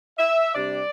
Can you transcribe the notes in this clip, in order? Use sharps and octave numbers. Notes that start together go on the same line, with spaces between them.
E5
C3 G3 D4 D5